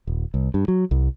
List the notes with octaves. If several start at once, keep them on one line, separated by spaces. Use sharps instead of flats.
D#1
C2
G2
F#3
C2